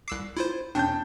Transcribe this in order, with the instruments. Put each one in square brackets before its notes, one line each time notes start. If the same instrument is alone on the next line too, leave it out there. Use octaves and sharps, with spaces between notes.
[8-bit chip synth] C2 C7 [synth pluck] D6 E6 F#6
[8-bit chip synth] E4 F4 C5
[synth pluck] E2 B2 C#4 [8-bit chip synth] D4 [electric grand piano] G5 A5 G6